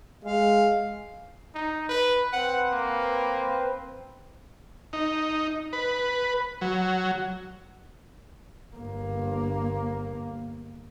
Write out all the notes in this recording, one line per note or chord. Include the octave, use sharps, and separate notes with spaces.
G#3 F5
D#4
B4
C4 B4 C5 F#5
A#3
D#4
B4
F#3
G1 A#3